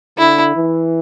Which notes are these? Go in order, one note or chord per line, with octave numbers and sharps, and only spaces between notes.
D3 E4
E3